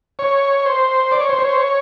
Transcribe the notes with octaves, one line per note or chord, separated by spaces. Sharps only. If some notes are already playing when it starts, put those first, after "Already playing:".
C#5
C5
D5
C#5
C5
C#5
C5
C#5